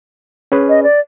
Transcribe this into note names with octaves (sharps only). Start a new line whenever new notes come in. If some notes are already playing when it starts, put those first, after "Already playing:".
C#4 G#4 B4
D#5
D5